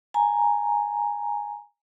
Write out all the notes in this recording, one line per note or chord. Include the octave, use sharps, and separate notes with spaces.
G#5 A#5